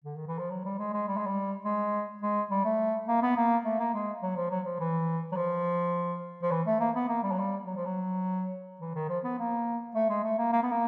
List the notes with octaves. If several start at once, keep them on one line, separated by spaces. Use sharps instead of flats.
D3
D#3
E3
F3
F#3
G3
G#3
G#3
G3
G#3
G3
G#3
G#3
G3
A3
A#3
B3
A#3
A3
A#3
G#3
F#3
F3
F#3
F3
E3
F#3
F3
F3
E3
A3
A#3
B3
A#3
G3
F#3
G3
F#3
F3
F#3
E3
D#3
F3
B3
A#3
A3
G#3
A3
A#3
A#3
B3
A#3